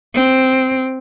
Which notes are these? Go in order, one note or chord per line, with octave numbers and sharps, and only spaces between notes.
C4